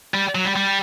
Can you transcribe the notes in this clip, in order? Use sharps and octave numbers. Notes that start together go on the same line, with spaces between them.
G3
F#3
G3
G3